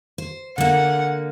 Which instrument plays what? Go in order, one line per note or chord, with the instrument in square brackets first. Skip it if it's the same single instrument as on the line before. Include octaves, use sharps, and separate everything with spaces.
[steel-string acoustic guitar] C5
[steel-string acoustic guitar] D3 A#3 [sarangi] F#5